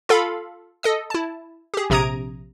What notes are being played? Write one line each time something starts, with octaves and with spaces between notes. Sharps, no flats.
F4 A4 F5 B5
A4 D#5 D#6
E4 A5
G4 G#4
A#1 C3 A#5 D#6 G#6 D7